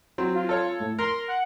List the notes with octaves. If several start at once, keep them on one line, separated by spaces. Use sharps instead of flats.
F#3 C4
F4
A4 C#5
A2
A#4 C6
F#5